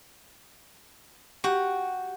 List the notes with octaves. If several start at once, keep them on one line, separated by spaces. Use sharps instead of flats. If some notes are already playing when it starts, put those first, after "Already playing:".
F#4 G4